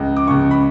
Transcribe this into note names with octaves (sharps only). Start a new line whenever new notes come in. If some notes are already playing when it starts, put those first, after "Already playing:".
Already playing: C#2 C#3
D6
C#2 C#3 C#6
B5